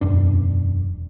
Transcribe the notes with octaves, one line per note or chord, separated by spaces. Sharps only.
E1 F#2 D4